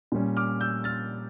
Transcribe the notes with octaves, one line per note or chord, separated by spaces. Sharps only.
A#2 G3 C#4
D6 F6
E6 G6
F6 A6